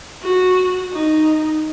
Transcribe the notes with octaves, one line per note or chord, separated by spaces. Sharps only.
F#4
D#4